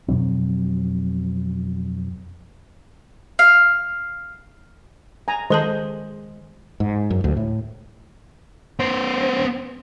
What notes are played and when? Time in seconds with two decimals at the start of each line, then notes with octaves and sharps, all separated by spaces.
0.08 F2 B2 F#3 C4
3.39 F5
5.28 G#5 A#5
5.50 D#3 G#3 A4 C5 D#5 A5
6.80 G#2
7.11 F#2
7.24 D2
7.37 A2
8.80 B3 C5